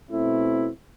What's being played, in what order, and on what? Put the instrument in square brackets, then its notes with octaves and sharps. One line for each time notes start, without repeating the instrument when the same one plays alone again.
[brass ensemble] B2 A3 C4 E4